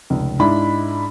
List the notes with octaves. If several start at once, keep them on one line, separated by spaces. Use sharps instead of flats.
F1 C#2
G#2 G#3 D4 E4 B5